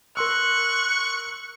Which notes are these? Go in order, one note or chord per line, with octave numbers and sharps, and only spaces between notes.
A#4 C6 C#6 E6 F#6